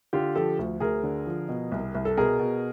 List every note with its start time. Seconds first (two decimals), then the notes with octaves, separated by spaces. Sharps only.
0.13 D3 F4 G4
0.35 F3 G4 A4
0.59 D2
0.80 D2 G#4 A#4
1.03 D3
1.26 F3
1.49 B2
1.72 C2
1.95 C2
2.05 A4
2.17 B2 G#4 A#4
2.39 B2